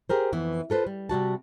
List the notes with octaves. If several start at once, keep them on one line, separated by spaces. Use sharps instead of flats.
G4 G#4 A#4 C5
F2 E3 B3
F4 A4 B4 C5
G3
C3 G3 F#4 A5